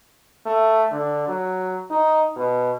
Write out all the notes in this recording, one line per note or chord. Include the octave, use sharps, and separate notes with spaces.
A3
D3
F#3
D#4
B2